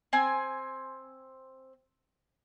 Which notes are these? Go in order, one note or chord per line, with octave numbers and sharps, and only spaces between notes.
C4 G#5